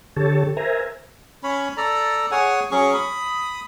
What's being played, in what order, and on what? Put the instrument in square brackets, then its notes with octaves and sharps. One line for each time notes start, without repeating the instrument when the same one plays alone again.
[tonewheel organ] D3 G4 A4 C#5 A5
A#4 C5 E5 G#5 A#5
[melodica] C#4 C#5 B5
A4 D5 A#5
G#4 C#5 F#5 G#5
F#3 C#4 G#4 C#6
B5 D#6